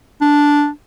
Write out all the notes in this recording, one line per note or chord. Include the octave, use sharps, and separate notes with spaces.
D4